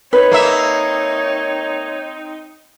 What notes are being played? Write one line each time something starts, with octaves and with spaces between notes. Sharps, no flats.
C4 D#4 B4 C#5
A#3 E5